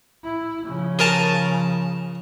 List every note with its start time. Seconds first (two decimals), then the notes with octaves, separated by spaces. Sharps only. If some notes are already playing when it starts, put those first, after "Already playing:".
0.24 E4
0.65 C#3 F3
0.99 G#4 A#4 A5